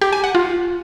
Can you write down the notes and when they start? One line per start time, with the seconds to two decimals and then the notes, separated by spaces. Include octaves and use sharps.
0.02 G4
0.13 G#5
0.24 F#5
0.35 F4